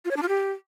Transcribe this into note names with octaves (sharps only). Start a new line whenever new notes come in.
F4
C#5
D4
F4
G4